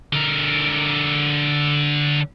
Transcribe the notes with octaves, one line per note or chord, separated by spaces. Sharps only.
D3 A#4